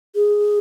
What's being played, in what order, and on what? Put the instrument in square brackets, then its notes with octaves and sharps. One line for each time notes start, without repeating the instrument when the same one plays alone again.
[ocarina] G#4